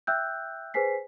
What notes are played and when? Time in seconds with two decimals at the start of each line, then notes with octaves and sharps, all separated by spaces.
0.07 E5 G5 E6 F#6 G6
0.74 G#4 B4 C5 G#5 B6 C7